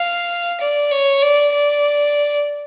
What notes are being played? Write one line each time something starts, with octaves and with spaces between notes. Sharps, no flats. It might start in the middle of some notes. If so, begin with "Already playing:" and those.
Already playing: F5
D5
C#5
D5
D5